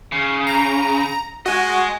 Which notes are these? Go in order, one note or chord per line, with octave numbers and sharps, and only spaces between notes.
C#3
A#5
F#4 D#5 G#5